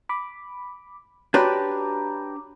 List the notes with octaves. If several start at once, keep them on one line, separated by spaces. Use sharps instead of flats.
B5 D6
D4 F#4 G4 B4 C#5 A#5 C6 D6